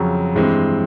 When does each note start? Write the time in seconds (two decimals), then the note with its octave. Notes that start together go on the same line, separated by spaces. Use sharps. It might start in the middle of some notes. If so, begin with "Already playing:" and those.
Already playing: F2 C#3 F#3
0.35 G2 E3 G#3 C4